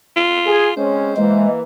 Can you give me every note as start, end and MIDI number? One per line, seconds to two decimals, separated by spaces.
0.16 0.75 65
0.46 0.67 68
0.77 1.15 56
0.77 1.15 60
0.77 1.15 61
0.77 1.49 72
1.17 1.62 52
1.17 1.47 56
1.17 1.62 58